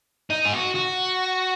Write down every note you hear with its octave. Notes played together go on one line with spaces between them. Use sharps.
D#4
G#4
F#4
F#4